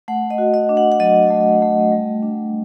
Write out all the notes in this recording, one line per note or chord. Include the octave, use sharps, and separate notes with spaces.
A3 F#5
D#5
F#4
D#5
D4
F#5
F#5
F#3 D#5
A3
A3
G3
D4